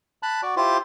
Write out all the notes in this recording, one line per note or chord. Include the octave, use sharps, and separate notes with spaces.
A5 B5 F#6
F#4 D5
E4 F4 G4 C5 C6 D6